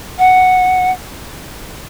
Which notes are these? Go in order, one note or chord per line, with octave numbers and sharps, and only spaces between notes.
F#5